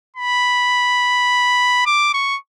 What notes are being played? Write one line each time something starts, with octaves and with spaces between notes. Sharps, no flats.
B5
D6
C#6